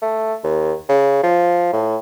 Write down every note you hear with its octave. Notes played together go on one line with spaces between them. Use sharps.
A3
D#2
C#3
F3
A2